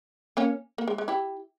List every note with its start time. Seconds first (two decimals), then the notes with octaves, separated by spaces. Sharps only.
0.37 A#3 C#4
0.78 A#3
0.88 G#3
0.98 G#3
1.08 E4 G4